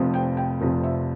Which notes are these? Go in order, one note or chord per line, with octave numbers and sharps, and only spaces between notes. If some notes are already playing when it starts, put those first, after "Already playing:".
Already playing: F1 F2 C3 F3
G5
G5
F1 F2 C3 F3
E5